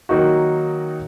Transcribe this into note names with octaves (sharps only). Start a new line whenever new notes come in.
D#3 F#3 A#3 D#4 F#4